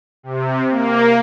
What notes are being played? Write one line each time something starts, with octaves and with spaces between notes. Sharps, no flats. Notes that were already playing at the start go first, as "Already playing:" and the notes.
C3
A#3